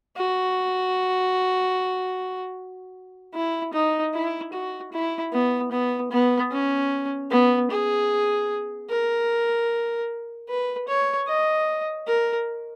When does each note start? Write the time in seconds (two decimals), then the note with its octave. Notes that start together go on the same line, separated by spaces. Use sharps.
0.17 F#4
3.35 E4
3.73 D#4
4.14 E4
4.53 F#4
4.93 E4
5.33 B3
5.72 B3
6.11 B3
6.52 C#4
7.31 B3
7.71 G#4
8.90 A#4
10.49 B4
10.88 C#5
11.28 D#5
12.07 A#4